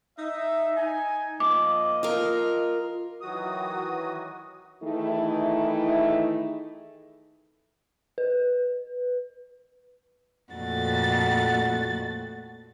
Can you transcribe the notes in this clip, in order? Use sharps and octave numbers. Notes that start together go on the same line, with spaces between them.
D#4 E5
D#4 G#5
F3 A#3 D#5 D6
F4 A#4
D#3 E3 F#3 F#4 D#6
D#3 E3 A3 D#4 E4 G#4
B4
F2 A#2 A3 F#4 A6